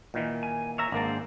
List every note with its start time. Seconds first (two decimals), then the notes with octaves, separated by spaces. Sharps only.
0.14 A#2 D#3 E3
0.43 G#5
0.78 C#5 E5 A#5
0.92 G#1 A#3 D4 G#4 C5 A5